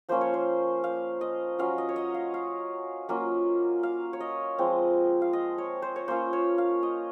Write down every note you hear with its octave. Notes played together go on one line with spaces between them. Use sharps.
F3 A#3 C#4 F4 C5
C#5
C5
F5
D#5
F#3 C#4 F4 F5
D#5
C#5
D#5
F5
F5
F#3 A#3 C#4 F4
F5
C#5
D#5
F3 G#3 C4
F5
D#5
C#5
C5
C#5
A#3 C#4 F4 C5
C#5
F5
D#5